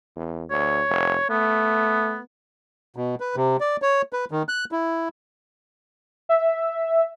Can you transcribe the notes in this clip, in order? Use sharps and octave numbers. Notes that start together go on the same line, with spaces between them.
E2
D2 C#5
F1
A3 B3
B2
B4
C3
D5
C#5
B4
D#3
F#6
E4
E5